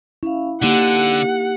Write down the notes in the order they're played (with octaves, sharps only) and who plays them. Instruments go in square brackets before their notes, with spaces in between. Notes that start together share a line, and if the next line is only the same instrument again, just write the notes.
[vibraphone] C#4 F5 [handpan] E4
[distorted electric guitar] D3 [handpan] A#3 D#4 [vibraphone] G4 [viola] F#5